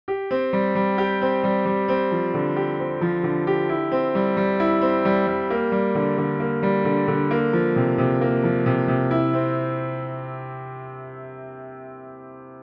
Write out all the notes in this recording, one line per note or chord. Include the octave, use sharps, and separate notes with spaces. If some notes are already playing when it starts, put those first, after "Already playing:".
G4
C4
G3
G3
G4
C4
G3
G3
C4
F3
D3
G4
C4
F3
D3
G4
E4
C4
G3
G3
E4
C4
G3
G3
A#3
G3
D3
D3
A#3
G3
D3
D3
A#3
F3
C3
C3
A#3
F3
C3
C3
E4
C4